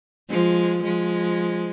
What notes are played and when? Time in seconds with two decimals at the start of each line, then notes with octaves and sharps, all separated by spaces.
0.30 F3 G#3
0.84 F3 G#3